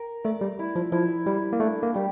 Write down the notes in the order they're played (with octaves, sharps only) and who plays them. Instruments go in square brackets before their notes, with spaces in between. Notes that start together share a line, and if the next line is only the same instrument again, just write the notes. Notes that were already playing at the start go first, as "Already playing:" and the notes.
Already playing: [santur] A#4
[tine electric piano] A3 [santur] D5
[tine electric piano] G3
[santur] E4
[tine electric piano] F3
[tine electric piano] F3 [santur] E4
[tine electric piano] G3 [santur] E4
[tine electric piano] A#3
[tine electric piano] A3 [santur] D4
[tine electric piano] A#3
[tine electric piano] G3 [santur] G4